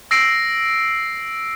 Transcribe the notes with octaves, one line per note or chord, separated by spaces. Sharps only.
E6 A#6 C7 D7